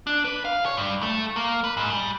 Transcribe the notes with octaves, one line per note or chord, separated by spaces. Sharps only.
D4
B4
F5
C#5
G2
A3
A#3
B4
G#2
G3